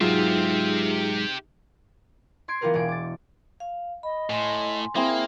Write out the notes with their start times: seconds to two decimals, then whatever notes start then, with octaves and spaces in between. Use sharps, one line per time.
0.01 G#2 F#3 G#3 D#4 F4 G4 G#4 E5
2.48 C6 G#6 C7 D7
2.61 E3 B3 F4 G4 A#4 B4
2.74 E1 B2 G#4 D7
2.89 D6 A6
3.60 F5
4.03 D#5 B5
4.30 A2 G#5 C6
4.96 A#3 C4 E4 G#4